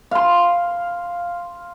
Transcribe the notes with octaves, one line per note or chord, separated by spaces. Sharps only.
F5 C6